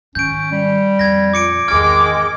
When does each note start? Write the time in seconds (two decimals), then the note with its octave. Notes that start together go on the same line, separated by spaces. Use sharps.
0.15 G#2 D#3 C#4 G6 D7
0.52 G3
0.99 F2 G#6 A#6
1.33 A#2 D6 C#7 D7
1.68 G#1 E2 D#3 G#3 D6 F6 G#6